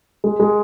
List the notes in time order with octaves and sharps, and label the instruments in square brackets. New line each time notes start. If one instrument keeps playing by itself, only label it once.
[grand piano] G#3
G#3